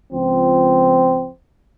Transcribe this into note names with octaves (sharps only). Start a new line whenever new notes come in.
C#2 F3 C4